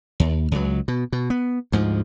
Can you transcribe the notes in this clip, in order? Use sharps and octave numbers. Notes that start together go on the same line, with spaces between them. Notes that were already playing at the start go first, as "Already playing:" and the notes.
D#2
C#2 F#3
B2
B2
B3
D2 G#2 F3